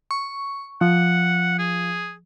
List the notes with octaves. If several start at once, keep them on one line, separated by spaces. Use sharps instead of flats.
C#6
F3 F#5
G#4